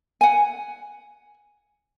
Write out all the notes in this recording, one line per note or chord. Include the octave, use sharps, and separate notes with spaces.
F#5 G#5